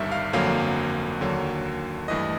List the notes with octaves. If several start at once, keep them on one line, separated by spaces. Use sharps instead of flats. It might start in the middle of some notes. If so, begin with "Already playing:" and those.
Already playing: G1 G2 D#3 G3 E5
F5
G1 F2 D3 F#3 A#3 F5
D#2 D3 F#3 A#3
G2 E3 A3 D#5